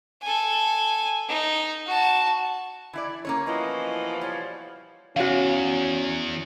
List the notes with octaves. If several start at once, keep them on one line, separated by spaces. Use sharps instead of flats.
A4 G#5
D#4
F#4 A5
E3 E4 D5
A#3 C#4 C#5
B2 E3 F3 D#5
G3 C#5
E2 C#4 F#4 F5